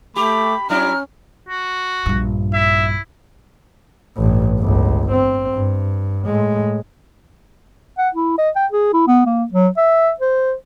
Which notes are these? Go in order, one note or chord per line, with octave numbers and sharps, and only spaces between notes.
A3 G4 B5 D6
F#3 C#4 D4 E4 A#5 F6
F#4
A#1 G2
E4 E5
A1 G2
G1 C#2
C4
G2
A2 G#3
F#5
E4
D#5
G5
G#4
E4
B3
A#3
F#3
E5
C5